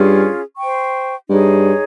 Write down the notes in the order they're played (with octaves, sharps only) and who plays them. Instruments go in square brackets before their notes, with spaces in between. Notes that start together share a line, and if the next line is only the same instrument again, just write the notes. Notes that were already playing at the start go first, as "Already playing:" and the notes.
Already playing: [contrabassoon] G2 [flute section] C#4 F4 G#4
[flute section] C5 G5 C#6
[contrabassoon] G2 [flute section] D#4 G#4 C#5